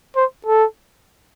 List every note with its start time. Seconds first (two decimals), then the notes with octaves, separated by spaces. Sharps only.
0.16 C5
0.46 A4